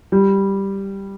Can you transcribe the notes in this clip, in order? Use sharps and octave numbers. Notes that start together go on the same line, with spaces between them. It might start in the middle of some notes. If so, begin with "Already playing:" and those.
G3